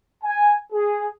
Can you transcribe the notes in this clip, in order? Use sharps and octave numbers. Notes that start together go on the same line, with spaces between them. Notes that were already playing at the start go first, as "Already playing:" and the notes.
G#5
G#4